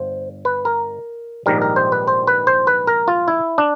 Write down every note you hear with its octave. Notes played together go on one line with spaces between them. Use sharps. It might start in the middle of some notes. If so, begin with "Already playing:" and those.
Already playing: G1 C5
B4
A#4
A#1 G#2 D#3 G3 A#4
A#4
C5
B4
C5
B4
C5
B4
A#4
F4
E4
D4